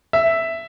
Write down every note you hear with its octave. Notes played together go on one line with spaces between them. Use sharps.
E5